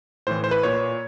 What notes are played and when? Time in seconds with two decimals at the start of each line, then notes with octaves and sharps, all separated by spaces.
0.27 A2 E3 C5
0.44 C5
0.51 B4
0.63 A#2 C#5